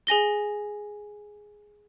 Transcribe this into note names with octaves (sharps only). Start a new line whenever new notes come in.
G#4 G#5 A#6 G7